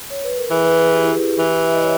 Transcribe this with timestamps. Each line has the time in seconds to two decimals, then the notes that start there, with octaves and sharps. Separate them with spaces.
0.10 C#5
0.24 B4
0.37 A#4
0.51 E3 G#4
0.64 B4
0.79 G#4
0.93 G4
1.04 E4
1.13 G4
1.39 E3
1.65 E5
1.73 D#5
1.82 C#5